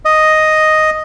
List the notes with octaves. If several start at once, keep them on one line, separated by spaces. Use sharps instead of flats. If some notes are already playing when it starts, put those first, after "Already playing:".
D#5